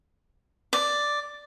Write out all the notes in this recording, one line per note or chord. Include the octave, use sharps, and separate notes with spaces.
D5